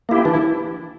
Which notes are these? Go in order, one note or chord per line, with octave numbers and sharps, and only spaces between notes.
A#3 E4 G4
E3 D4
E4